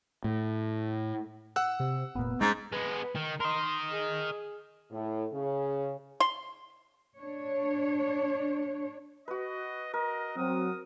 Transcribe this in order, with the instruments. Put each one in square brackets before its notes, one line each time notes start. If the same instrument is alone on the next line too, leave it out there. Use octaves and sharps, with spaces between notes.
[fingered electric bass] A2
[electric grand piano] F#5 E6 F#6
[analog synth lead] C3
[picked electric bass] F1 A#2 [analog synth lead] B3
[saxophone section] G#2 [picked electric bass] G#3 C4 C#4 [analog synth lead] G6
[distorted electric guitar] G#3 B3 [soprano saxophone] B4
[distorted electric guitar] D#3
[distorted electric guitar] A#4 D#5 [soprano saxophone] C6
[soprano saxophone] G#4
[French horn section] A2
C#3
[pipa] C6
[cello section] D4 C#5
[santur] F#4 B4 [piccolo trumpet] D#5
[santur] A#4 [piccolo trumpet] D#5
[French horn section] F#3 C4 [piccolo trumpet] D#6